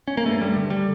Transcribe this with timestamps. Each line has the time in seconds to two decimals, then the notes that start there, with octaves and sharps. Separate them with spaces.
0.08 C#4
0.17 A#3
0.26 G2 A3
0.41 G3
0.56 D3
0.70 G3